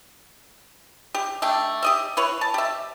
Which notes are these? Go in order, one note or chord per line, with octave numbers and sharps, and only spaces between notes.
G4
A3 D4 G5
G4 D#5 E5
E4 B4 C#5
A5
G4 E5